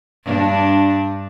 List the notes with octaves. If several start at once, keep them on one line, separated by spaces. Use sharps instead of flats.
G2 D4